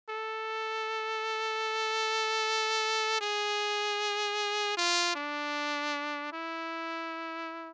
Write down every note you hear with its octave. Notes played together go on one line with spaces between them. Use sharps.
A4
G#4
F4
D4
E4